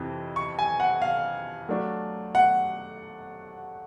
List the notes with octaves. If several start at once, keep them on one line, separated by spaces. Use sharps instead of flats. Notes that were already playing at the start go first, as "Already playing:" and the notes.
Already playing: F2 C3 E3
C#6
G#5
F#5
F5
F#3 A3 D4
F#5